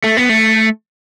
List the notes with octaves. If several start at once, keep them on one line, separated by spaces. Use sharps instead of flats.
A3
B3
A3